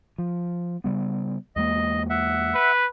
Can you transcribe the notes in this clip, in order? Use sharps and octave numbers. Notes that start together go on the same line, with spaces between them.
F3
C#3 G3 B3
E2 G#3 A#3 D#5
E5 F#5
B4